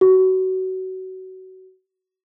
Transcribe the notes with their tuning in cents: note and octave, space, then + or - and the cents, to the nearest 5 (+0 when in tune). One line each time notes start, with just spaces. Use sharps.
F#4 +25